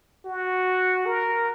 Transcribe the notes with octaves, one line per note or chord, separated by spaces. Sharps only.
F#4
A#4